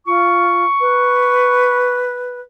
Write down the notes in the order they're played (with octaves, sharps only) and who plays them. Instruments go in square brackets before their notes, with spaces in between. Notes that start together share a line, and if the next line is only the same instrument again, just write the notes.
[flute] F4 [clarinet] C#6
[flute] B4